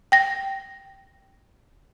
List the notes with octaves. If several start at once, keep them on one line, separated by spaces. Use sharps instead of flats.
G5 A#6